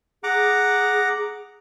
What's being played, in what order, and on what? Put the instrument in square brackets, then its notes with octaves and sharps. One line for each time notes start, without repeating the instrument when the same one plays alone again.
[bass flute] G#4 [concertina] F#5 A#5 D6